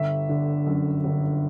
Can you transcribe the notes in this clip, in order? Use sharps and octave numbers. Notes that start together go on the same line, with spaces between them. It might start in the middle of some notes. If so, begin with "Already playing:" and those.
Already playing: G1 E5
D3
F#2
G1